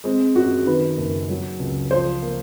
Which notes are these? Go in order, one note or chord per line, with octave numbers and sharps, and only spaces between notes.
G#3 C4
F#2 F#4
D#3 B4
F#1
F#3
C#2
F3 C5
A#3